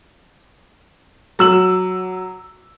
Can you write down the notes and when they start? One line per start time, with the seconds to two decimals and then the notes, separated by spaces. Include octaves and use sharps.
1.39 F#3 E6 F#7